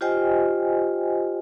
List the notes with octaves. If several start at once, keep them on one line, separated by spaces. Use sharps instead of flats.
F4 G4 C5 D#5 G5 G#5